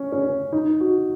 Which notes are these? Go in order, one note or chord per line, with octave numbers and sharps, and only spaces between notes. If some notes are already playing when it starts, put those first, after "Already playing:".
Already playing: C#4
C#4
D#4
F#4